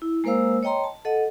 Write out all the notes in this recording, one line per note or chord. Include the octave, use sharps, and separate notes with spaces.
E4
G#3 A#3 A#4 C5 F5 E6
C#5 D#5 G5 A#5 C6
A5
A4 D#5 F#5